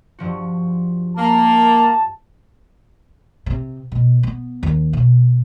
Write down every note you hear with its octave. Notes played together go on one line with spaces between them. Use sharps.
G2 F3 F#4
A#3 A5
C3
B2
B3
D#2
B2